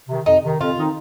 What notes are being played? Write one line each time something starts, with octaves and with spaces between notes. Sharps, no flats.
C3 D#3
F2 D#4
C3 D#3
F2 F4
D#3 C4 D#4